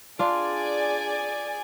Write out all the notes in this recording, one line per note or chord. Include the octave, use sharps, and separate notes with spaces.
D4 F4 G#4 D5 G#5